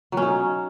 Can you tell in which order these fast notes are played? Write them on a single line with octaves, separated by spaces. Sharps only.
F#3 C#4 D#4